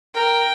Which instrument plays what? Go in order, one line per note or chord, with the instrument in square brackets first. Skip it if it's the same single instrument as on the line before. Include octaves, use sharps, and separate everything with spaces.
[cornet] A#4 [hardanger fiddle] G5